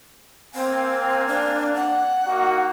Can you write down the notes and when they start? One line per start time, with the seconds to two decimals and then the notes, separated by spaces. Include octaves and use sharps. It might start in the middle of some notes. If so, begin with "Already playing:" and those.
0.55 A#3 C4 F5 G#5
1.27 D4
1.74 F#5
2.26 A#3 D#4 F#4